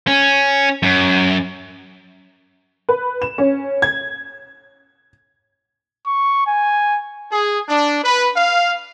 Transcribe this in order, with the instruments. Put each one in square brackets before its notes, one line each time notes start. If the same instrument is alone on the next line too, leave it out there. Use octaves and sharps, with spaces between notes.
[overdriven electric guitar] C#4
F#2
[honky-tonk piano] B4
E7
C#4
G#6
[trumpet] C#6
G#5
[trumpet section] G#4
D4
B4
F5